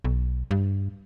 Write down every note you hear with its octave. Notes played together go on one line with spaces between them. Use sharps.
B1
G2